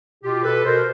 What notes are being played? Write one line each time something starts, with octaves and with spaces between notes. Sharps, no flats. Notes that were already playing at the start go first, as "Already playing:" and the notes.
B2 F4 G4
B2 A4 B4
B2 A#4 C5